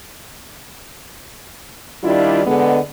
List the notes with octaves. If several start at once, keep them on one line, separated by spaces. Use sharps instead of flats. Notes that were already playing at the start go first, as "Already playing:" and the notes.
D#3 G3 D4 E4 F4
D3 G#3 B3